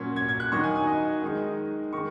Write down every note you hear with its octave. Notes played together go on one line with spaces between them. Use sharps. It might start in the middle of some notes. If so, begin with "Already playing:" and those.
Already playing: A#2 F#3 C#4
G#6
G#6
F#6
D#3 F#3 D#4 C#6
G#5
G#5
D#5
D#3 G#3 D#4
D#3 G#3 D#4 C#6